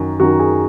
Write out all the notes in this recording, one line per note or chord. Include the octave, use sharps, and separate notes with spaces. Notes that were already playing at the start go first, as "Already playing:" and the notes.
Already playing: F#2 D#3 F#4
F#2 D#3 F#4
G#4